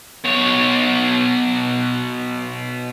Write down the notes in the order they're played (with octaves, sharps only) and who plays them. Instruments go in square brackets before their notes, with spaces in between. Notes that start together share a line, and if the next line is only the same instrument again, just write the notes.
[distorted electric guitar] B2 C#5